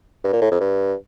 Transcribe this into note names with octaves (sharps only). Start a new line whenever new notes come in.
G2
A#2
A2
F2
G2